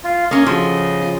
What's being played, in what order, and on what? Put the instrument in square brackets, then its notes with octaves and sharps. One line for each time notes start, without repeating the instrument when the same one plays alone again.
[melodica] F4
[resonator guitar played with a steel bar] A#3 C#4 [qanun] C#5 [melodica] D#5
[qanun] C#3 F#4 A4 [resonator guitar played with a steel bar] F3
[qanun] F4